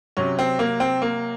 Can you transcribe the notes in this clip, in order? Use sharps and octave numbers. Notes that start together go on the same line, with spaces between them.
C3 F#3 C#4
C4
A#3
C4
A#3